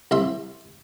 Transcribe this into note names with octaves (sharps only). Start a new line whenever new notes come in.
C2 E4 E5 C6